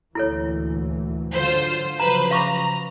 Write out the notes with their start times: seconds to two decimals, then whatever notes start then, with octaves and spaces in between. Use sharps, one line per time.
0.15 D2 A#2 E3 E4 A4 C#5
1.35 G#2 D3 F#3 F4 C5
2.00 C#3 F3 F#3 B4 C5 A#5
2.31 F5 A#5 C#6 D6